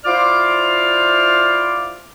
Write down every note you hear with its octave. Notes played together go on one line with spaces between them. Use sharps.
E4 F4 C5 D5 D6 F6